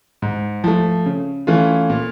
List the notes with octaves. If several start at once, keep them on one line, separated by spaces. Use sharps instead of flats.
G#2
F3 A3
C#3
E3 A3 C#4 F4
A#2